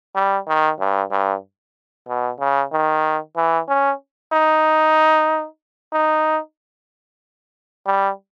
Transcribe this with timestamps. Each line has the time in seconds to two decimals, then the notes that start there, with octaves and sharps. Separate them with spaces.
0.15 G3
0.48 D#3
0.80 G2
1.11 G2
2.08 B2
2.40 C#3
2.72 D#3
3.37 E3
3.69 C#4
4.33 D#4
5.93 D#4
7.87 G3